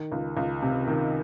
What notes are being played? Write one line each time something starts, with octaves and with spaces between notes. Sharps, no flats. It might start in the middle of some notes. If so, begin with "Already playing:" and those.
Already playing: D#3
C#2
C#2
C3
D#3